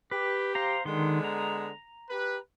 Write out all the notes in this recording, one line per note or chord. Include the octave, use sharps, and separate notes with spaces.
G4 B4
C5 F5 A#5
D3 D#3 G#3 B3 C6
A#5
G4 B4